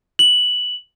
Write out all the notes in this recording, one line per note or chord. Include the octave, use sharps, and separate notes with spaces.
F#7